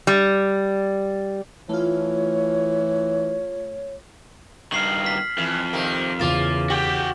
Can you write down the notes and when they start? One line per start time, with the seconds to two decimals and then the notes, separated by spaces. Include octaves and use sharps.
0.07 G3
1.69 E3 A3 F4 C#5
4.72 G2 D#3 F6 C7 F#7
5.04 F6 B6
5.38 F2 E3
5.73 C3 D#3 A#3
6.19 E2 C#3 A#3 F4 D6 A6 E7
6.70 F#4 G4 G5